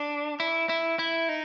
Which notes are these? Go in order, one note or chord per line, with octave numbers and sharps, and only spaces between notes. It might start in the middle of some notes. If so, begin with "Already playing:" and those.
Already playing: D4
E4
E4
E4
D#4